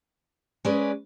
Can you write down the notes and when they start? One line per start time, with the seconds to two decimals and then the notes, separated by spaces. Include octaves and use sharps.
0.65 G#3 C#4 G#4 B4 D5